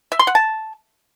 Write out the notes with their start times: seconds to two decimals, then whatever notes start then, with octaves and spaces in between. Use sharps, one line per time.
0.12 E5
0.19 C6
0.27 F#5
0.35 A5